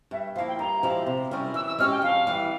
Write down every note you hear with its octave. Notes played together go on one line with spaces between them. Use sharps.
G2 E5
F3 A#3 E4 F5
G5
G2 A#5
F3 G#3 E4 G4
C3
G3 C#4 E4 A#4
E3 E6
E6
G#3 C#4 G4 F6
G5
F2 F5
E3 G3